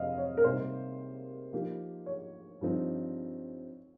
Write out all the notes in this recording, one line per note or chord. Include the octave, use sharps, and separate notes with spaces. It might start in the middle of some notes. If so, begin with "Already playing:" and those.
Already playing: F2 C3 C4 D#5 F5
C#5
A#4
C3 G3 A#3 D#4 G4 C5
F3 A#3 D#4 G4
C#5
G2 F3 C4 D#4